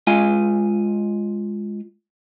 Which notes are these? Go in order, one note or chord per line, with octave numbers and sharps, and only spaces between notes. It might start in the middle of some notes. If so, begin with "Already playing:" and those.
G#3 F4 G#5